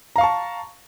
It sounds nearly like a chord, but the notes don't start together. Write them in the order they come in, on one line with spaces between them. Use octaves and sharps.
A#5 F5 C#6 A5